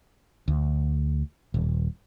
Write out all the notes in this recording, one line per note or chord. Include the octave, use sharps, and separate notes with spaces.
D2
D#1